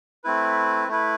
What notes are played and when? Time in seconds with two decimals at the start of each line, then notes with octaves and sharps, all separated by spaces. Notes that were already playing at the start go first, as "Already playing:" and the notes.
0.24 A3 C4 E4 B4
0.88 A3 E4 B4